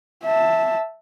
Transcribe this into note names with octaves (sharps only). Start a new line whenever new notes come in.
E5 A5